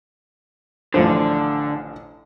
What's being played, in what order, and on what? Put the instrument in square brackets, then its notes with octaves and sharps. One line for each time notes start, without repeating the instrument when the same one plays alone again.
[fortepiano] A1 F3 C5 [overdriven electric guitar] D3